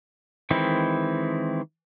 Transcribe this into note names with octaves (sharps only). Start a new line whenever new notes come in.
D#3 E3 G#3 C4 E4